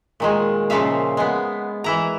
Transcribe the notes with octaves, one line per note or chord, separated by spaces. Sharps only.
A#2 D#3 G#3
A#2 C#3 F3 E5 F5
G#3 B3
E3 E4 A#5